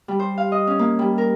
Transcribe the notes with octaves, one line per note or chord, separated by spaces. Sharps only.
G3
C5
F5
D#5
C#4
A#3
G3
A#4